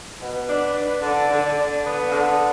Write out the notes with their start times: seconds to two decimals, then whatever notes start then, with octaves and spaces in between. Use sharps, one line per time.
0.22 B2 B4
0.48 D4
0.75 D4
1.03 D3 D5
1.31 D3
1.45 D5
1.57 D3
1.84 B3 B4
2.12 D3